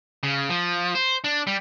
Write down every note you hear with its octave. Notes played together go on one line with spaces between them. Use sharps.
C#3
F3
C5
D4
G3